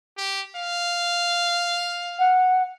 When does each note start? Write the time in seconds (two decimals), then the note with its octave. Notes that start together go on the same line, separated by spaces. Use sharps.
0.18 G4
0.56 F5
2.19 F#5